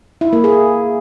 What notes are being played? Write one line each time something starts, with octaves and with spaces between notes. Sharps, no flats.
E4
A#3
G#4